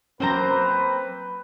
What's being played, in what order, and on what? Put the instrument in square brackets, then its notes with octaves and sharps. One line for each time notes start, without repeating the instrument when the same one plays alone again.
[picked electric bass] F#3 C#4 [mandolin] A#3 C5 A#5 [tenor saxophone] C4 [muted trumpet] B4